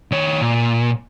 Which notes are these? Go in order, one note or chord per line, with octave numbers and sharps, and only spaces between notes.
D#3 C#5
A#2